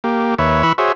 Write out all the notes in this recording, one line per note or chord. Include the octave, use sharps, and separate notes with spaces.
A#3 G4
D#2 B4 C#5 E5
E3 B4 B5 C#6 E6
F#4 G#4 C5 C#5 E5